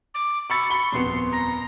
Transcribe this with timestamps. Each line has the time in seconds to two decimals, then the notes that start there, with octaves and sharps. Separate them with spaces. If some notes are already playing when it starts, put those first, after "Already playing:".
0.14 D6
0.50 B5 C#6 E6 A6
0.70 B5 G7
0.92 D#1 F2 B3 C6
1.32 A#5